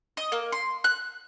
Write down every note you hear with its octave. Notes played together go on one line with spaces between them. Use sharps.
D#5
A#3
C6
F#6